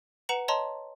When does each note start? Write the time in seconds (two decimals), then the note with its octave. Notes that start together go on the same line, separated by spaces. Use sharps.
0.29 B4 F#5 A#5 C#7 E7 F#7
0.48 C#5 D#5 A5 A#5 C6